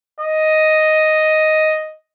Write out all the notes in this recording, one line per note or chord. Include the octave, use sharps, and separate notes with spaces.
D#5